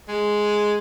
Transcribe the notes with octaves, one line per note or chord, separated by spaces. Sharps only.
G#3